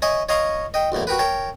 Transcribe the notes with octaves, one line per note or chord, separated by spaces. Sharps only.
C#5 D#5 E5 G#5 C#6
C#5 D#5 F5 A#5 C6 C#6
D#5 G5
B1 E2 A2 A#3
F#4 G4 A#4 B4
A#4 C#5 G5 A5